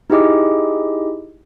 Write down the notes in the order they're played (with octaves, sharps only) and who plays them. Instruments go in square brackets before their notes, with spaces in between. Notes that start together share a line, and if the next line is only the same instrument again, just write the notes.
[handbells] D#4 E4 G4 G#4 D#5 D6